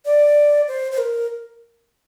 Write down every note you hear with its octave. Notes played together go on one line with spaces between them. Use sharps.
D5
C5
C5
A#4